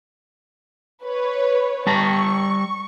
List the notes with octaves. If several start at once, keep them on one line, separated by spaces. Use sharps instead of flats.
B4 C#5
G3 A5 A#5 C#6